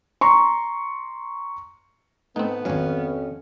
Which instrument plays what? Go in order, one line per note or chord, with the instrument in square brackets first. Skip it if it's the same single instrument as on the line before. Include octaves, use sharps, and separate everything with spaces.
[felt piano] A#5 C6 C#6
[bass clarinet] G#2 [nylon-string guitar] A3 [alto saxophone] B3 [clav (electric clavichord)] C4 D#4
[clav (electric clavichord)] G#1 F#3 [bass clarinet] F2 [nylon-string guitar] C#4 F#4 F5